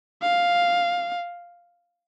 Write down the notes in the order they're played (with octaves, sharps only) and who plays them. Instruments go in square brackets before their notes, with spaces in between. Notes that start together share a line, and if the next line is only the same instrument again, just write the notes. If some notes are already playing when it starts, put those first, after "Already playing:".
[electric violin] F5